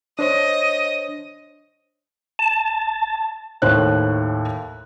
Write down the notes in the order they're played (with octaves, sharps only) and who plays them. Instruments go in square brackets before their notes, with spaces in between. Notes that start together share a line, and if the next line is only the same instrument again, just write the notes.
[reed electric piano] D4 C5 C#5 [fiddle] D#5
[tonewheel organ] A5
[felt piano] D#2 A2 C5 C#5 F#6